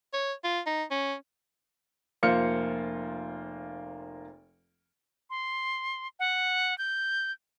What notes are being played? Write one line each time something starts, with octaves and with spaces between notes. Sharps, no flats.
C#5
F4
D#4
C#4
F1 A#3 F4 C5 F6 C#7
C6
F#5
G6